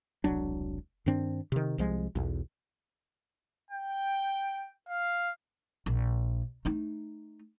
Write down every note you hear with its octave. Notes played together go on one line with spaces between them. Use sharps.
E1 C2 F#3 D4
G2 D#3 C4 D4
C3 D#3
C2 F3 G#3
B1 E2
G5
F5
A#1
A3 D#4